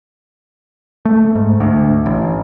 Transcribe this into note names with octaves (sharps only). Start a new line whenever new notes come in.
A3
G#2
D2
A1